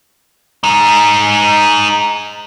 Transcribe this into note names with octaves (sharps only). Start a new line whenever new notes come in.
G#3 D#4